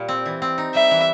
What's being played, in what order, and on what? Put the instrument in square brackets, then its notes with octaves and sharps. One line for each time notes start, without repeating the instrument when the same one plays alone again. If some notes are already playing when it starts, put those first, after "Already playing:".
Already playing: [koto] A#2 G3 F4
C4
E3
C4
D#4
[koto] G3 [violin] E5
[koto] E3